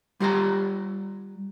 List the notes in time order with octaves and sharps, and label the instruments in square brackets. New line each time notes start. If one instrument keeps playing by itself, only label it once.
[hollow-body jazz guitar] G3 F4 G4 A#5